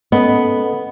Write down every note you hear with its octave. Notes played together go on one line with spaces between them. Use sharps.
B3 C#4 A4 D#5